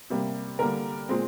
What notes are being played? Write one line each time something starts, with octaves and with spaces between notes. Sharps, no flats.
C3 G3 A#3
D3 G3 A#3 A#4
A#2 G#3 C4